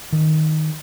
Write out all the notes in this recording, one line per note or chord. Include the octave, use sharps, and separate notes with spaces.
D#3